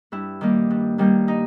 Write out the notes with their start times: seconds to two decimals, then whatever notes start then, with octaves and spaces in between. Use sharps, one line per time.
0.12 G2 E4
0.41 D#3 G3 A#3
0.70 G2
0.98 D#3 G3 A#3
1.28 D#4